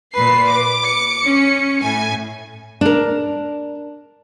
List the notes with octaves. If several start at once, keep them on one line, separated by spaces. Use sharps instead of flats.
A#2 B4 C7
D6
C#7
C#4
A2 G#5
D4 A#4